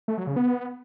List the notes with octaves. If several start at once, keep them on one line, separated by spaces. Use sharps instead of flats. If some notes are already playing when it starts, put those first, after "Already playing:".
A3
F#3
C#3
B3